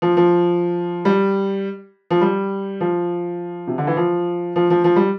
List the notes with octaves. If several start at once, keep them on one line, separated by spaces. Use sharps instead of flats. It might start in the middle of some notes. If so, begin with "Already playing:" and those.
F3
F3
G3
F3
G3
F3
C3
D3
E3
F3
F3
F3
F3
G3